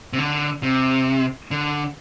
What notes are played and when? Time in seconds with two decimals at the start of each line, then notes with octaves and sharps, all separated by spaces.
0.13 C3
0.18 D3
0.63 C3
1.51 D3